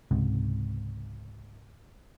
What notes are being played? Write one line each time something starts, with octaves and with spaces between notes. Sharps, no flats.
C#2 G#2 C3